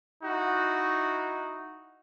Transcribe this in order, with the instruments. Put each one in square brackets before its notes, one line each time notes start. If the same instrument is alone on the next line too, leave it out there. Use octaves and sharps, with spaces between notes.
[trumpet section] D#4 E4 F#4